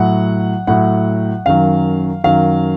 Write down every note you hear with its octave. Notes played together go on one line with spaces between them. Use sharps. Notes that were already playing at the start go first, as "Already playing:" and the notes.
Already playing: A2 F#3 F#5
A2 F#3 F#5
F#2 D#3 F#3 F5
F#2 D#3 F#3 F5